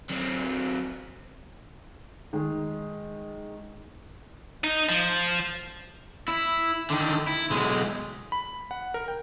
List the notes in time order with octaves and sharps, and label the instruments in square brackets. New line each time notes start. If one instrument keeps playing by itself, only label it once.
[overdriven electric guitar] F#3 C4
[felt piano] D#3 G#3
[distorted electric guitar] D#4
F3
[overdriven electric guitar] E4
D3 D#3
E4
B1 G#3
[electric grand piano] B5
F#5
A#4
G5